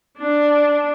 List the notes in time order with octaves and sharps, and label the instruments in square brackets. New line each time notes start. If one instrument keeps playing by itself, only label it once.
[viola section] D4